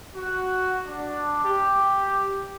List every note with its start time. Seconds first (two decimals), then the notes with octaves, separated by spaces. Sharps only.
0.15 F#4
0.86 D4
1.43 G4